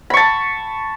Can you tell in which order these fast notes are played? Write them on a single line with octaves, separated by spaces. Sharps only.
B5 C#6 A5